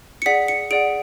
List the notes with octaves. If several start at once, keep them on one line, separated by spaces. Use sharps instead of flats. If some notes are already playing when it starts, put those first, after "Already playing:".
C#7
G#4 D5 F#5 B6
C#7
G#4 D5 F#5 D7